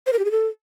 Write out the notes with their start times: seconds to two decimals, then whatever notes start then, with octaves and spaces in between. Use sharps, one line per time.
0.07 C5
0.13 A#4
0.19 G4
0.25 G#4
0.31 A4